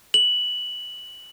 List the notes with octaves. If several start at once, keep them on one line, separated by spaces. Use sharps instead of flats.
F#7